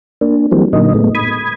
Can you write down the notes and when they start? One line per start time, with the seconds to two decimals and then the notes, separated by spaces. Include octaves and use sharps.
0.21 A#3 D4
0.51 E3 F#3 G3 A#3 C4
0.73 A#2 D3 F#3 A#3 D#4 D#5
0.94 A2 G#3 A3 B3
1.15 B5 D#6 G#6